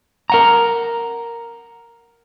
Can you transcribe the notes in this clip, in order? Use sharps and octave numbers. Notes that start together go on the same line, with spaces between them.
A#4 F#5 A#5